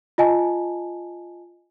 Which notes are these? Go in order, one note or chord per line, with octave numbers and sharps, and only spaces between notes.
F4 D#5 G#5 A5